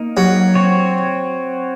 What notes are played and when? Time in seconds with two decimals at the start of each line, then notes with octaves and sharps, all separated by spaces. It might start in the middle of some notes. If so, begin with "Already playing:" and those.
Already playing: A#3 D#4 A#4
0.17 F#3
0.55 C4 F#4 C#5